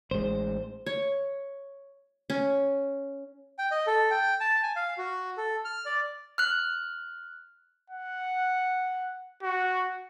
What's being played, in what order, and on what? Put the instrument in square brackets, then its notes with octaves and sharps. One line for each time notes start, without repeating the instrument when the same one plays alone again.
[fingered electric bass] A1 G#3 [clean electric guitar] C5
[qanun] C#5
C#4
[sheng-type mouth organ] G5
D#5
A4
G5
A5
G#5
F5
F#4
A4
F6
D5
[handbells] F6 F#6
[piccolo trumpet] F#5
F#4